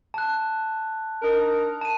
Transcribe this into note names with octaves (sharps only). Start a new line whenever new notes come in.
A5 F#6
D4 D#4 A#4
A5 D#7